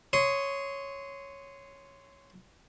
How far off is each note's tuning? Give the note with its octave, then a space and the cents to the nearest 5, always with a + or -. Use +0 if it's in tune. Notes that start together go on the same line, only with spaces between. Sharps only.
C#5 +0 C6 -15 D#6 +0